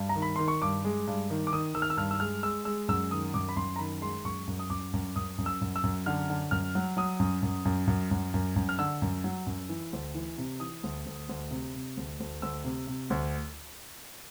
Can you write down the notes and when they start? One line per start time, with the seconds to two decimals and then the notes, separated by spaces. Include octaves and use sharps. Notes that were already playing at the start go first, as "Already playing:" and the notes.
Already playing: G2
0.09 A#5
0.15 D#3
0.22 B5
0.36 D#3 C6
0.48 C#6
0.62 G2 D6
0.85 G#3
1.07 G2
1.30 D#3
1.47 D6
1.52 D#3 D#6
1.74 D#3 E6
1.82 F6
1.90 E6
1.97 G2 F6
2.11 E6
2.20 G#3 F6
2.43 G#3 E6
2.65 G#3 E6
2.88 F#2 E6
3.11 D#3 D#6
3.34 F#2 D6
3.49 B5
3.57 F#2 C6
3.76 A#5
3.79 D#3 B5
4.02 G#3 C6
4.25 F#2 C#6
4.47 F#2
4.59 D#6
4.70 F#2 D6
4.93 F#2
5.16 F#2 D#6
5.38 F#2
5.46 E6
5.61 F#2
5.76 E6
5.84 F#2
6.06 D3 F6
6.30 D3
6.51 F#2 F6
6.75 F#3
6.97 F#3 D#6
7.20 F#2
7.43 F#2
7.65 F#2
7.87 F#2
8.11 F#2
8.34 F#2
8.56 F#2
8.69 F6
8.79 D3 E6
9.02 F#2
9.24 F#3
9.47 F#2
9.69 E3
9.93 D2
10.15 E3
10.38 C3
10.60 E3 D#6
10.84 D2
11.06 D2
11.29 D2
11.51 C3
11.74 C3
11.97 D2
12.20 D2
12.42 D2 E6
12.64 C3
12.87 C3
13.10 D2